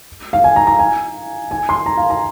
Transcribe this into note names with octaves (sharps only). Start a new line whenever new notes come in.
F5
G#5
A#5
A#5
G#5
G#5
C6
A#5
F5
A#5